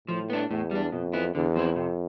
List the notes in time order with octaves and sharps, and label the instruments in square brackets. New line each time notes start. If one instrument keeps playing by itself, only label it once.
[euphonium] A2 [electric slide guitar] F3
[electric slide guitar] B3 D4
[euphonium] E2 [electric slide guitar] A2
[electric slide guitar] G3 D4
[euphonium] F2 [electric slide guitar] B2
[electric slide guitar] B3 E4
[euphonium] E2 [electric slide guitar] D3
[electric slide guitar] F3 C4 E4
[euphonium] F2 [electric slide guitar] C3